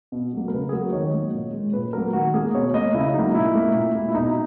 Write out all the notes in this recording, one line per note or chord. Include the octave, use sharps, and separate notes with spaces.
B2
F#3 A#3
A#4
C#3 B4
G#4
F#3 A#3 A#4
D#3 C#5
F#3 A#3
A#2
G#3
A#2 B4
F#3 A#3 A#4
D#3 F#4
A#3 G#4
B2 C#5
A#3 D#5
C#3 E4
F#3 A#3 D#4
A#2 E4
A#3
A#2
A#3
E4
B2 D#4